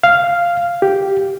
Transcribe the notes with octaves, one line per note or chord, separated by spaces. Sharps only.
F5
G4